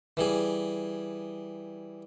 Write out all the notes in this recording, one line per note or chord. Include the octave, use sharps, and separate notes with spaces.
E3 G3 G#4